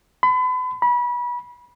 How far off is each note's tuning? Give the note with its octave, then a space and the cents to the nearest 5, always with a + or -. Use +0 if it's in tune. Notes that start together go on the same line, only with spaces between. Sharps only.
B5 +40
B5 -25